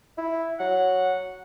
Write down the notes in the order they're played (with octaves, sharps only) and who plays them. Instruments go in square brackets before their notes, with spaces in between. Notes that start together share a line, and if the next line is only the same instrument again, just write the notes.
[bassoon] E4
[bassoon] F#3 [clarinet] F#5